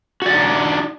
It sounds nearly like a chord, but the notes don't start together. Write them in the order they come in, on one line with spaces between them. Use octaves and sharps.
F#4 D5 F#5 D#4 D4